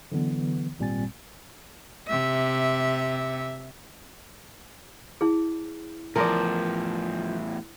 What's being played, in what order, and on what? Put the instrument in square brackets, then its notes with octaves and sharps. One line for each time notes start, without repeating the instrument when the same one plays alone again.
[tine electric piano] D3 E3 F#3 B3
G#1 A#2 G3 C4 G#5 A6
[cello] C3 E5
[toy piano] E4 G#4
[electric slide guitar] E2 A2 [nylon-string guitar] F3 [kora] A#4 D5